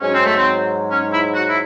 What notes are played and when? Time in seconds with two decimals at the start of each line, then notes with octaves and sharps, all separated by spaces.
0.01 G#2 F#3 C#4
0.13 C4
0.24 A3
0.36 C4
0.90 C#4
1.12 E4
1.34 F#4
1.48 E4